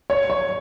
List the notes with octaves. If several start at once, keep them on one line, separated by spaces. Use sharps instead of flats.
C#5
C#5